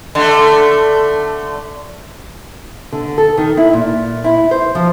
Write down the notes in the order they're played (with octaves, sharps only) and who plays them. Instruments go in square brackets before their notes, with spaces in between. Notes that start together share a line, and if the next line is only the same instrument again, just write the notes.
[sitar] D3 A3
[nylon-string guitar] D3
A4
D#3
E4
A#2
E4
C5
F3